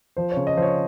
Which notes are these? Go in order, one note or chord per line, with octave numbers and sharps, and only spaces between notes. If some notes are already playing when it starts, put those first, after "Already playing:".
F3 C5
C#3 C#5
D#5
F3 C5
C#5